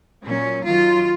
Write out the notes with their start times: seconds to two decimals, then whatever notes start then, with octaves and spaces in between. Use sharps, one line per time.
0.24 A#2 F#3 C#4
0.65 F#2 D#3 F#3 F4